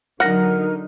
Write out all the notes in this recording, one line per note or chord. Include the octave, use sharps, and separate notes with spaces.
D3 F#3 D#4 A#4 F#5 F6 A#6